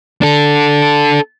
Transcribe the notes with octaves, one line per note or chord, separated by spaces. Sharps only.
D4 A4